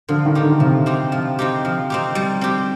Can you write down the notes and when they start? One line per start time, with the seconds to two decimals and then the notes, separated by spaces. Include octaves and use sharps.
0.08 D3 F3
0.26 D#3
0.35 C4 D#4 G4
0.44 D3
0.60 C3 F3
0.86 C4 D#4 G4
1.12 F3
1.39 C4 D#4 G4
1.65 F3
1.90 C4 D#4 G4
2.15 G3
2.41 C4 G4